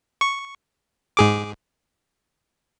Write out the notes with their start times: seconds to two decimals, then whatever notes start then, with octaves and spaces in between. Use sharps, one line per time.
0.21 C#6
1.17 G#2 G#4 D6